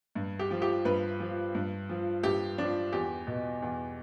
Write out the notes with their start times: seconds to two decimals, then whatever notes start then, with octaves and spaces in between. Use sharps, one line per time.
0.15 G2
0.39 G4
0.51 F3
0.62 G4
0.85 G2 B4
1.20 F3
1.55 G2
1.89 F3
2.23 G2 G4
2.58 F3 D4
2.92 E2 G4
3.27 B2
3.62 E2